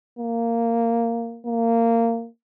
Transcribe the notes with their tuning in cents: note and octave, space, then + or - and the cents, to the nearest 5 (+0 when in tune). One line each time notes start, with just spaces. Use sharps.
A#3 -10
A#3 -20